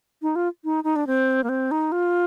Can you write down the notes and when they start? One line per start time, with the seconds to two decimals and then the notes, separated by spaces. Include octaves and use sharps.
0.22 D#4
0.36 F4
0.64 D#4
0.84 D#4
0.96 D4
1.07 C4
1.44 A#3
1.49 C4
1.71 D#4
1.92 F4